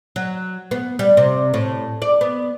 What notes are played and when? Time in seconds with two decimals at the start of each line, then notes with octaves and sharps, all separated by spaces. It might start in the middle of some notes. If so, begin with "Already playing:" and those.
0.16 F#3
0.71 B3
0.99 G3
1.17 C3
1.54 A2
2.02 D5
2.21 B3